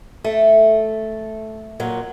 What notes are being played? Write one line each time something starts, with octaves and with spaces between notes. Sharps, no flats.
A3
A#2 F#3